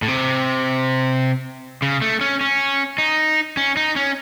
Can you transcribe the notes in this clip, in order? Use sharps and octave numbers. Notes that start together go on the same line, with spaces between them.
A2
C3
C#3
A3
C#4
C#4
D#4
C#4
D#4
C#4